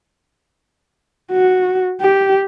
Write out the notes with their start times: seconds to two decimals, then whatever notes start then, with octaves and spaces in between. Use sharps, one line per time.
1.32 F#4
2.01 G4